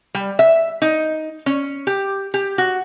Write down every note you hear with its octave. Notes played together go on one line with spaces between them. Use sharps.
G3
E5
D#4
C#4
G4
G4
F#4